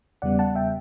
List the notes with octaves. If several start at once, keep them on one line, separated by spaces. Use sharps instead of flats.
E2 C#3 G3 B3 D5 F#5
F#5 A5
E5 G5